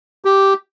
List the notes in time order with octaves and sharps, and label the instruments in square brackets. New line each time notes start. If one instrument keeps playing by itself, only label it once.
[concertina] G4